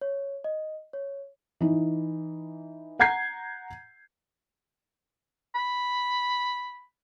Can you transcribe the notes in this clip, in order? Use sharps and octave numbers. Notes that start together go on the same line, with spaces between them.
C#5
D#5
C#5
E3 D#4
F#5 A#5 G6 G#6 C7
B5